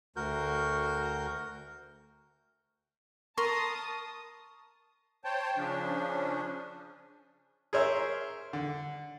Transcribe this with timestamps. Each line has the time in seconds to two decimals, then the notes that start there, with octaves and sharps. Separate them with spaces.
0.16 D2 F#4 A#4 G6
3.38 A#4 A5 C6 C#6 D#6
5.24 C5 C#5 G5 A5
5.57 C#3 F3 C#4 D4
7.73 G#4 A#4 C5 C#5 E5
8.53 D3